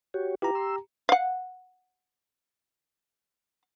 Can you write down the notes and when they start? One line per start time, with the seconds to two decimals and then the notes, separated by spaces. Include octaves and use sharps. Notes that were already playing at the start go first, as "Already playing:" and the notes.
0.14 F#4 G4 C#5
0.42 E4 F4 G4 B4 A#5
0.55 C6 E6
1.09 F5 F#5